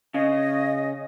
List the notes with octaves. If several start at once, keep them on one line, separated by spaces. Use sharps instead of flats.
C#3 D#5